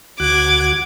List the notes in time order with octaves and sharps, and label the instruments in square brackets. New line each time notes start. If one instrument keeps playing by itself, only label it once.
[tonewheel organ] D2 F#4 F#6 [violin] D6 G#6